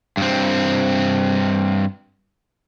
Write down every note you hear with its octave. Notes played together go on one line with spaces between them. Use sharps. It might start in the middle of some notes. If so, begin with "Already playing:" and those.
G2 C4